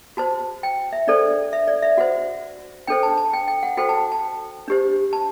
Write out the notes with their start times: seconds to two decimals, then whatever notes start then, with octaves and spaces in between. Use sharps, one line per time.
0.17 F#4 C5 A5
0.63 G5
0.93 E5
1.07 D4 A4 C5 D5
1.53 E5
1.67 D5
1.83 E5
1.98 F#4 C5 F#5
2.87 D4 A4 C5 G5
3.03 A5
3.18 A5
3.33 G5
3.48 G5
3.63 F#5
3.77 F#4 A4 C5 G5
3.89 A5
4.12 A5
4.68 D4 G4 C5
5.13 A5